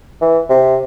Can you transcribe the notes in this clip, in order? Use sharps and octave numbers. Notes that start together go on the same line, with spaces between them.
E3
C3